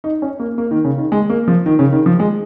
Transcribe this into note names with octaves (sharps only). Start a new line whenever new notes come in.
D#4
C#4
A#3
A#3
D#3
C#3
D#3
G#3
A#3
F3
D#3
C#3
D#3
F3
G#3